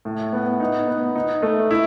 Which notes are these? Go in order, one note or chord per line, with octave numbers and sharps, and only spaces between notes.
A2
B3
D#4
B3
D#4
A3
E4